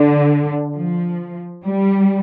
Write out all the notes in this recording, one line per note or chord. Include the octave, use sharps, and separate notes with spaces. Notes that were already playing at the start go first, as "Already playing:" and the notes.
Already playing: D3
F3
G3